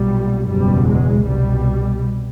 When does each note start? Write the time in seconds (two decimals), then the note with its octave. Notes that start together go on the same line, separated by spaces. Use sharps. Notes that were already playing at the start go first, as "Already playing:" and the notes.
Already playing: B1 A#2 G3
0.49 F#1 E2 B2 G3
0.88 G#3
1.27 C2 B2 G3